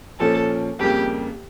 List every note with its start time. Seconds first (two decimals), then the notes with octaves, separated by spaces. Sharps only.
0.20 A#2 F3 C#4 A4
0.79 F2 C#3 G3 A#3 G4